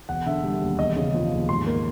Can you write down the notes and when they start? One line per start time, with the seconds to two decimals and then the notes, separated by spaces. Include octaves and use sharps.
0.09 E1 F#5
0.26 D3 E5
0.43 G3
0.61 D#2
0.79 E1 D#5
0.96 C#3
1.14 F3
1.31 D#2
1.49 G#2 C6
1.67 A#3